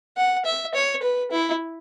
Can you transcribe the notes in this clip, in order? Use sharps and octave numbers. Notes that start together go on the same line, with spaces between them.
F#5
E5
C#5
B4
E4